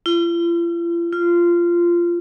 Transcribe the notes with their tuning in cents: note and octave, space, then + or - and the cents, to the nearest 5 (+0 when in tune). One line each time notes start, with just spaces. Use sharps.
F4 -45
F4 -15